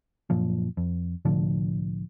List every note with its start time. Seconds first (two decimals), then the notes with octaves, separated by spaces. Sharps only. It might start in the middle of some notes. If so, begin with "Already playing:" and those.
0.30 F#2 A#2 F3
0.77 F2
1.25 C2 A2 D3 F3